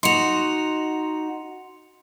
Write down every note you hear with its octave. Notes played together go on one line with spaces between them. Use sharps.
D#4 F#4 C6 C#7 F7